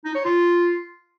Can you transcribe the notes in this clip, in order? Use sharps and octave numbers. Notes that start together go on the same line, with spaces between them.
D#4
C#5
F4